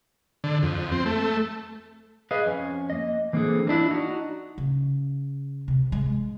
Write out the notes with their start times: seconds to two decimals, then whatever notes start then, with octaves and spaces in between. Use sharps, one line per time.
0.44 D3
0.63 F2
0.92 C4
1.06 A3
2.31 G#4 B4 D#5 F5
2.46 F2 C#4 G#5
2.90 A#3 D#5
3.33 E3 A#3 C4 D4 G#4 A4
3.67 A#3 C4 D4 E4 F4
3.91 D4 D#4 F#4
4.58 C#3
5.68 C3
5.92 G#3